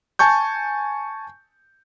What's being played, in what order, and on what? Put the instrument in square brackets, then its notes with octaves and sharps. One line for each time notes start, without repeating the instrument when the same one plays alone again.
[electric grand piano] G#5 A5 C#6 G6